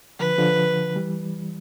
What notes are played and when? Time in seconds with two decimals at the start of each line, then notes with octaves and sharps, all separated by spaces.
0.19 D3 F3 B4
0.38 D3 F3
0.96 E3 G3